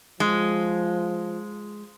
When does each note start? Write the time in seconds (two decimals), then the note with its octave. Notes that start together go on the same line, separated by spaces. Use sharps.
0.20 F3 G#3